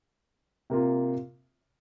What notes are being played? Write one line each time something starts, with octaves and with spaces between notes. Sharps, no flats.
C3 A#3 F4